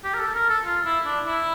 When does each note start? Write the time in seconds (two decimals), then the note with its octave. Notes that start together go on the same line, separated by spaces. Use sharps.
0.04 G4
0.14 A#4
0.19 A4
0.34 A#4
0.50 A4
0.66 F4
0.85 E4
1.06 D4
1.26 E4